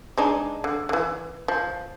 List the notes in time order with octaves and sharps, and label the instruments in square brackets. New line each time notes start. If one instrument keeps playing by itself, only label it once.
[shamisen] G#3 D4 D#4
D3
D3 E3
F3